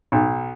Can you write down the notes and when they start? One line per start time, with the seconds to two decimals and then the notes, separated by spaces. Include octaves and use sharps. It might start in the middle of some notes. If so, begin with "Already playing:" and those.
0.12 B1